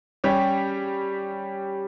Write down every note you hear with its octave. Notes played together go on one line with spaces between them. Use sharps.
G3 C#4 G4 C#5